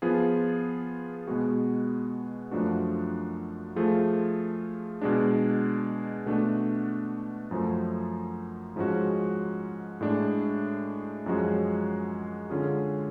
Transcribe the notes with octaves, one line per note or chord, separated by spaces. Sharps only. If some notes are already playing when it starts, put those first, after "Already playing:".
F3 B3 F4 G#4
B2 G#3 B3 F#4
F#2 F3 A3 D4 F#4
F3 A3 F4 G#4
B2 G#3 D4
B2 A3 D4 F#4
F#2 F3 A3
G#2 F3 G#3 C#4 F#4
A2 G#3 D4
F#2 F3 G#3 C#4 F#4
D3 G#3 C#4 F4 G#4